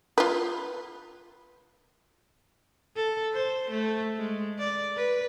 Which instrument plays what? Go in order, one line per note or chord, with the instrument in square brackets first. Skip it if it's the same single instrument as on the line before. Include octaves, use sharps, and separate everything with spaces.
[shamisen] F4 B4
[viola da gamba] A4
C5
A3
G#3
D5
B4